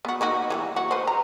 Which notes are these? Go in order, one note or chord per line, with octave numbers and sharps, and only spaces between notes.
B3 F#4
A#3 D#4 F#4
E3 F#3 G3
F#4
B4 C5
A#5